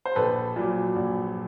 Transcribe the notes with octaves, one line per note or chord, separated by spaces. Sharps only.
C5
A#1 A4 B4
A#2 F#3
A#1